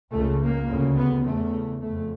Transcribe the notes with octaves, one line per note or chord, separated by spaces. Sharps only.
C#2 C#3 A3
A#3
D2 C#3
B3
E2 C#3 A3
F2 C#3 A3